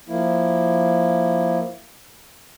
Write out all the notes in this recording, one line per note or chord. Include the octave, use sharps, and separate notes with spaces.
F3 A#3 E4